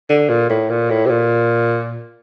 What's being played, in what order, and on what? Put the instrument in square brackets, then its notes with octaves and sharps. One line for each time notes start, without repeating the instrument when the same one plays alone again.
[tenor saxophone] D3
A#2
A2
A#2
A2
C3
A#2